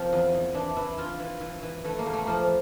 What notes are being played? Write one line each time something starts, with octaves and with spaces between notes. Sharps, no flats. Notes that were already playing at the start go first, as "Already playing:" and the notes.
Already playing: F3 A#3 C4
E2
E2
E3 D4
E3 E4
E3 F4
E3
E3
E3
E3 A3
A#3
E2
A3
F3 A#3